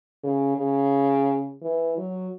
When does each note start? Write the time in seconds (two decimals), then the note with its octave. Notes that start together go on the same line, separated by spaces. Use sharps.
0.23 C#3
0.57 C#3
1.62 E3
1.97 F#3